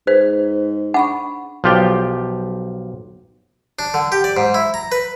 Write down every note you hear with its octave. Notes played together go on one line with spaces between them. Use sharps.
G#2 G#4 B4 C5
D4 F#5 B5 C#6
B1 F3 F4 G4 D5 G5
D4
D3
G4
D5
G#2
E4
A#5
B4